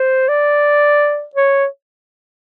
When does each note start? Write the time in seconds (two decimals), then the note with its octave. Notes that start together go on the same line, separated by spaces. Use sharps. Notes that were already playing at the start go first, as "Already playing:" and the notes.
Already playing: C5
0.29 D5
1.35 C#5